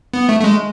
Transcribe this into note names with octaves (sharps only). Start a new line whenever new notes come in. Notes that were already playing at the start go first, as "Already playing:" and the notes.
B3
A3
A3
G#3